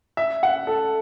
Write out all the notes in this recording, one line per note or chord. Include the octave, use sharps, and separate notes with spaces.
E5
F#5
A4